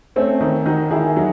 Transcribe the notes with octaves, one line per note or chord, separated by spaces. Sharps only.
A3 C4 C#4
D#3
D#3 D#4 F#4
D#3 E4 G#4
F#3 D#4 F#4